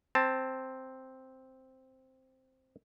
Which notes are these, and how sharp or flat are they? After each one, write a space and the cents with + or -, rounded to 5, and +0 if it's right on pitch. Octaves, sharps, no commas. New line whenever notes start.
C4 +0 A5 +5